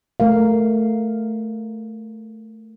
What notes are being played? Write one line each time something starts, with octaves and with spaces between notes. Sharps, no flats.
A3 A#4 F5